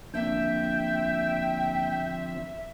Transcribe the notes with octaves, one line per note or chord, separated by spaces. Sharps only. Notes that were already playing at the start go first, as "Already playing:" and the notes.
G#1 D3 F3 A#3 C4 D4 E5 G5